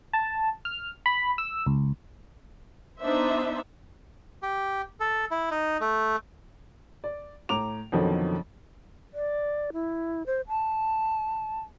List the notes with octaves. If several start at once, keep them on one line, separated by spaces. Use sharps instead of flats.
A5
F6
B5
E6
C#2
B3 D4 D#4 C5 E5
G4
A4
E4
D#4
A3
D5
A2 A#5 D6 F7
F2 B2 D3 D#3 F3 F#3
D5
E4
C5
A5